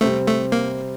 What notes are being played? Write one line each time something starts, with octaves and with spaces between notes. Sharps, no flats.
C3 G3 A3 C4
A3
A#3